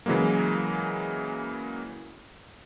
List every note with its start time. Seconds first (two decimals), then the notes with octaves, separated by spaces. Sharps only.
0.06 C#3 E3 F#3 G#3 A#3